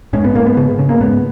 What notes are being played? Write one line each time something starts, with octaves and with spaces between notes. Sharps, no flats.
G#2 C#4
B3
G#2 A#3
B3
C#3
C#3
A#3
G#2 B3